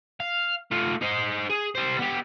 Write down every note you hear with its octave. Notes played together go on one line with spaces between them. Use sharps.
F5
A3 F4
D#4 C5
G#4
G3 C5
B3 G4